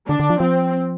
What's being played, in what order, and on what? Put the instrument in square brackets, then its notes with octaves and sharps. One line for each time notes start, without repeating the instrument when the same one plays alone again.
[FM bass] D3 [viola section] D4
[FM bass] D3
F3
[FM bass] F3 [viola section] C4